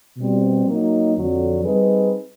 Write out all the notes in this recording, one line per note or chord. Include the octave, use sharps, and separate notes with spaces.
B2 G3 C4
F#3 A#3 D#4
F2 D3 F#3
G3 C4 D#4 G#4 B4